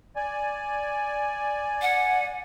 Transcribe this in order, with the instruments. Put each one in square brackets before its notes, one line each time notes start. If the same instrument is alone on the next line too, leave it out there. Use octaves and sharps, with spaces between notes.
[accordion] D5 G#5
[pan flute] F#5